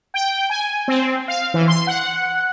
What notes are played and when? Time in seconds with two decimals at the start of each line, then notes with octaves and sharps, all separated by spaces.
0.14 G5
0.50 G#5
0.88 C4
1.28 F5
1.54 E3
1.68 C6
1.87 F#5